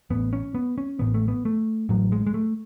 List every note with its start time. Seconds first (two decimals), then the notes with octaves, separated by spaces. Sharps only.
0.10 A1 A2 B3
0.33 C#4
0.55 B3
0.78 C#4
0.99 A1 A2 B3
1.14 A3
1.28 B3
1.45 A3
1.89 A1 A2 F#3
2.12 G#3
2.27 G#3
2.34 A3